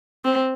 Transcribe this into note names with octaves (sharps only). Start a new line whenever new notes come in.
C4